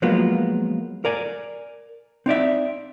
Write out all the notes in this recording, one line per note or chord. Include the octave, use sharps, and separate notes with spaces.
F3 F#3 G#3 A#3 B3 F4
A#4 D5 G#5
C4 D#4 D5 E5